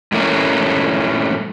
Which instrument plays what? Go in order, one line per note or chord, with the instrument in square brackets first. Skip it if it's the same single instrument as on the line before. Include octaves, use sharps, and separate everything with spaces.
[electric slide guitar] G2 A#2 E3 A3 A#3 C#4